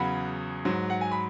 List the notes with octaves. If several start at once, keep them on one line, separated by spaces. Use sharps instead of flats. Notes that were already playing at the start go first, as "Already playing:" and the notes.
Already playing: E2 C#3 F#3 F#5 B5
G#2 F#3
F#5
G#5
B5